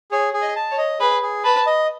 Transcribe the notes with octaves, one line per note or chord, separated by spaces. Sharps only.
G#4 C#5
G#4
D#5
A5
C#5
D#5
G#4 B4
G#4
B4 A5
D#5